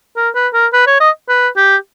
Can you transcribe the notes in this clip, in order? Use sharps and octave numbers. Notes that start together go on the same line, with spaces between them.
A#4
B4
A#4
B4
C#5
D#5
B4
G4